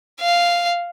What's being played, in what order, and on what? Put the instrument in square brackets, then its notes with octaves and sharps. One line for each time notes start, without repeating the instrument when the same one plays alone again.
[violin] F5